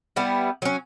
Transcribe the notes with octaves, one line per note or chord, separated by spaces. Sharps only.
G3 B3 E4
F#3 C#4